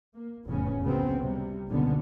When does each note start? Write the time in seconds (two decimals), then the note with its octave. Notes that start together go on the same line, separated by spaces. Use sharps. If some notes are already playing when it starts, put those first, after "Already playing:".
0.15 A#3
0.46 F1 E2 A2 C#3 B3 C#4
0.83 C#2 C#3 F#3 B3 C4
1.18 C3 G3
1.69 F#1 C#2 B2 D3 B3